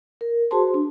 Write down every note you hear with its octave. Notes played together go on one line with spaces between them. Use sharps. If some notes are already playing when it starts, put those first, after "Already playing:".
A#4
F#4 G#4 C5 A5 C6
D4